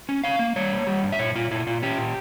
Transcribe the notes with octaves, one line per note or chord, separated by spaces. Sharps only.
C#4
C#4 F5
A#3
G3 C#5
A#3
G3
G2
E5
A#2 C#5
A#2 F4
A#2 E4
A#2 F4
C#4 G4
A#2